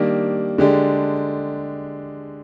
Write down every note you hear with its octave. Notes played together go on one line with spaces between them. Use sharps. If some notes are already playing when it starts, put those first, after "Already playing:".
Already playing: D#3 G3 A#3 D4
D3 G#3 D4 G4